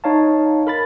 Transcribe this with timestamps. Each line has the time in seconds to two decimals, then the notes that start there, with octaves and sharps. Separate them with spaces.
0.04 D#4 C#5 F5 A5
0.67 A#4 B5 A6